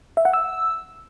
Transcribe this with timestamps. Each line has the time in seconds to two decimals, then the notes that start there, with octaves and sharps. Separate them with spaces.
0.17 E5
0.25 F#5
0.33 E6